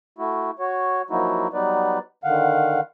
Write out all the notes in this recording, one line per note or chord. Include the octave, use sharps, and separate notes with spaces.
A3 E4 F#4
F#4 C#5
F3 F#3 A#3 D#4 E4 F#4
F#3 G3 B3 D#4 B4 D5
D3 D#3 F5 F#5